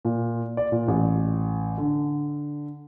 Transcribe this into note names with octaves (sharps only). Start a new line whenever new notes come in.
A#2
D5
A#2
A1
D3